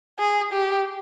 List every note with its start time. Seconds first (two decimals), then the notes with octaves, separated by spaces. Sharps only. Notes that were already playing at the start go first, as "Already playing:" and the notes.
0.19 G#4
0.53 G4